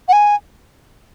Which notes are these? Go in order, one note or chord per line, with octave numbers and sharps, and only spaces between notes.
F#5
G#5